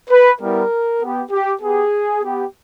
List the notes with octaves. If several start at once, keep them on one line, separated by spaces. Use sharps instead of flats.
B4
G3 B3 E4 A#4
B3 G4
G4
B3 G4 G#4
B3 G4